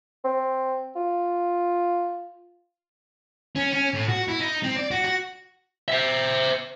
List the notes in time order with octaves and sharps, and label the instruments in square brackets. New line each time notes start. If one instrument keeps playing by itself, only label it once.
[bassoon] C4
F4
[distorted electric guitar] C#4
C#4
A2
F#4
E4
D#4
C4
D5
F#4
F#4
[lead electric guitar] C5 E5